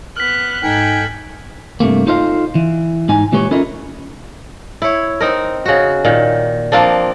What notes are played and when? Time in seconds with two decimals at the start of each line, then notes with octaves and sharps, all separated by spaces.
0.16 B3 F6 F#6 B6
0.63 G#2 D#4 A4 G5 G#5 F#6
1.80 G2 C3 A3 A#3
2.07 D#4 F4 A4 C5 D#5 F5
2.55 E3
3.09 G#2 D#4 G#5
3.32 A#2 E3 G#3 G4 B4 C#5
3.51 C#4 E4 F4 A4 A#4 D#5
4.82 E4 C#5
5.20 C4 D#4 A#4
5.66 C#3 F#4
6.05 A#2 D#3
6.72 F3 A#3 C4 D4